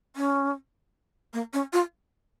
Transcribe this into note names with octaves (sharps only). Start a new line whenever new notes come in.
C#4
A#3
C#4
F4